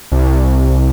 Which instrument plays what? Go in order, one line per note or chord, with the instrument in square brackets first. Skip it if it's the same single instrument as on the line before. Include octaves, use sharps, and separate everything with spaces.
[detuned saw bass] C2